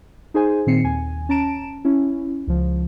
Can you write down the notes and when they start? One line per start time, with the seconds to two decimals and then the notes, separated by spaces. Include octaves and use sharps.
0.34 D#4 G#4 C5 G#5
0.67 A#2 D#3 C4 C7 C#7
0.84 D#2 G#5
1.29 C#4 A5 A#5 D7 E7
1.85 C#4 E4
2.47 C#2 F3